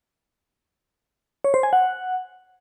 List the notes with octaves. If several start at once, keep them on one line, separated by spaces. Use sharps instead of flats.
C#5
C5
G#5
F#5